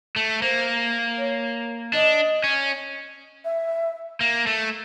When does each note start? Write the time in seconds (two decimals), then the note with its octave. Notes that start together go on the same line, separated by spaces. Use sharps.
0.16 A3
0.42 A#3 C5
1.18 C#5
1.93 D4 D#5
2.44 C#4
3.45 E5
4.21 A#3
4.47 A3